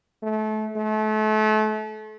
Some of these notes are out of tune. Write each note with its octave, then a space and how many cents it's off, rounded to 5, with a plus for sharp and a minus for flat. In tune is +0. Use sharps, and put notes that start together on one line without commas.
A3 -30
A3 -35